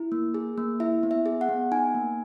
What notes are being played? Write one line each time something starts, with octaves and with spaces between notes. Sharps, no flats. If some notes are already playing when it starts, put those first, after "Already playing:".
Already playing: E4
A#3
G#4
A#3
E4 E5
B3
E5
G#4
F#5
B3
D#4 G#5
A#3